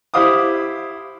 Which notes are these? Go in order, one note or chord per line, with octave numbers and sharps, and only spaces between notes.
E4 G4 C5 F5 D6 D#6